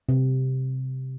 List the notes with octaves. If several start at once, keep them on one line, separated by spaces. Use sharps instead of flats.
C3